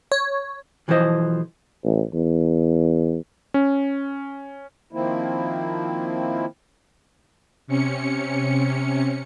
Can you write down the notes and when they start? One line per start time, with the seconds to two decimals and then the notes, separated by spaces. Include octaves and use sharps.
0.12 C#5
0.88 B1 E3 F3 F4 C5 D#5
1.84 A1
2.13 E2
3.54 C#4
4.93 D#3 F3 A#3 C4 E4
7.67 C3 C#4 C#7